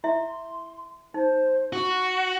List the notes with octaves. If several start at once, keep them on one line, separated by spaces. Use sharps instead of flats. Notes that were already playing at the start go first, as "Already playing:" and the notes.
E4 E5 C6
D#4 C5
F#4 C#6